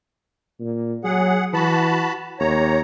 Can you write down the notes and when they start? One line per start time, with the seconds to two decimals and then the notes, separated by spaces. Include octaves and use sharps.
0.60 A#2
1.04 F#3 G#4 F#5
1.53 E3 F#4 A5 B5
2.40 D#2 C#5 A#5